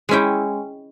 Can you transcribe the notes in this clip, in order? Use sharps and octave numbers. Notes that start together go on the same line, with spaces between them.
G#3 C#4 E4 G5